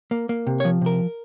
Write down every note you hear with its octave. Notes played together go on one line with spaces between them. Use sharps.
A#3
A#3
C3
C#5
F3
C3 A#4